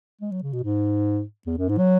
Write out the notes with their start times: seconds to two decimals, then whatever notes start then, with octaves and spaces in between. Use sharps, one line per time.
0.21 G#3
0.31 F#3
0.43 C#3
0.53 B2
0.63 G#2
1.47 E2
1.58 F#2
1.69 G#2
1.78 F#3